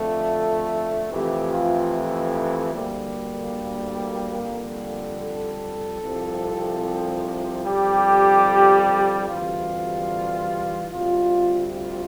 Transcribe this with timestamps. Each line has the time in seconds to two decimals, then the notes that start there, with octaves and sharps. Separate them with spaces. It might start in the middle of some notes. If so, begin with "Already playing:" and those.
Already playing: F2 D3 A3 A4
1.10 F2 C3 E3 A3 G4
1.51 F4
2.74 D2 D3 G3 A#3
4.38 F2 D3 G3
5.19 A4
6.01 C2 C3 F3
7.64 F2 D3 G3 G4
9.28 D2 C3 E3 G3 F4
10.92 D2 C3 G3 F4
11.73 F4